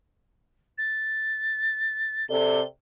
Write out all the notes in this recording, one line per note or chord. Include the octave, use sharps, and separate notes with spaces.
A6
C3 A4 D5 G7